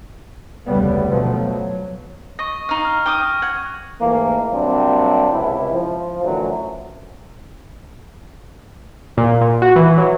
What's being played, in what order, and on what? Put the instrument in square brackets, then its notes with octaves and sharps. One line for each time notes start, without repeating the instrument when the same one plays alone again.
[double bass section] F1 D2 C#3 G3 B3
B2 D3 F3 F#3 A3 B3
F#3
[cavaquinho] D#5 [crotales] C#6 A#6
[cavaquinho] D#4 F5
[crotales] F6
[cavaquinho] G5 D6 D#6
[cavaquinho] F#5 [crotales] G#6
[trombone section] G#2 E3 A3 A#3
C3 F#3 G3 A#3 C4 D4
C#2 C3 E4
F3
F#2 A2 D3 E3 F#3
[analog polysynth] A#2
A#2
F#4
E3
F#3